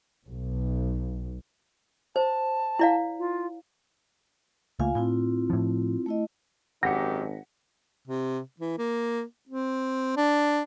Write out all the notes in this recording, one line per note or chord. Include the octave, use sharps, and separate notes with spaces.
B1
C5 A5
E4 D5 F5
F4
C#2 A3 A#3 F4 F5 G#5
A2 C4 E4 F4
A2 F3
A3 E4 D#5
G#1 F#2 D#4 G4 F#5 A#6 B6 C#7
C3
E3
A#3
C4
D4